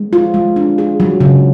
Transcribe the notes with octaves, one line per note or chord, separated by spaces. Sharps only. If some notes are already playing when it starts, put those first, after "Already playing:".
Already playing: G#3
F4
G#3
D4
G#4
F#3
C#3